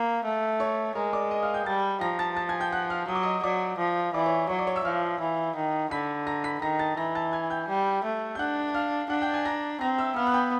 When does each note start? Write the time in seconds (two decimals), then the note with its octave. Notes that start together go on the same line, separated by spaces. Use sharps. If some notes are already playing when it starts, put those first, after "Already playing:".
Already playing: A#3
0.24 A3
0.60 C#5 C#6
0.95 G#3 A#4 A#5
1.13 D5 D6
1.31 D#5 D#6
1.43 F5 F6
1.54 G5 G6
1.66 G3 A5 A6
2.01 F3 A#5 A#6
2.19 A5 A6
2.37 A5 A6
2.49 G#5 G#6
2.60 G5 G6
2.72 F#5 F#6
2.90 F5 F6
3.08 F#3 D#6
3.15 D6
3.23 D#5 D#6
3.43 F#3 D5 D6
3.78 F3
4.14 E3 D5 D6
4.26 C#5 C#6
4.49 F#3 C#5 C#6
4.58 D5 D6
4.67 C#5 C#6
4.76 E5 E6
4.85 F3 F5 F6
5.21 E3
5.56 D#3
5.91 D3 B5 B6
6.27 A#5 A#6
6.44 B5 B6
6.62 D#3 A#5 A#6
6.79 A5 A6
6.97 E3 A#5 A#6
7.15 A5 A6
7.33 G#5 G#6
7.50 G5 G6
7.68 G3
8.04 A3
8.35 G6
8.39 D4 F#5 F#6
8.74 F5 F6
9.10 D4 F#5 F#6
9.22 G5 G6
9.34 G#5 G#6
9.45 A#5 A#6
9.81 C4 A#5 A#6
9.98 E5 E6
10.16 B3 F5 F6
10.27 F#6
10.34 G5 G6